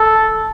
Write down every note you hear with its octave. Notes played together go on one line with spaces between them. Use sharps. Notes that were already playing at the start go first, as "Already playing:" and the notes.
Already playing: A4